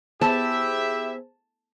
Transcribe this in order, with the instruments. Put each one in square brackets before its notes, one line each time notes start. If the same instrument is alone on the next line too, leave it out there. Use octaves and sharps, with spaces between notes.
[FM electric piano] B3 G#4 C5 [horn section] E4 G4 E5 [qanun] A5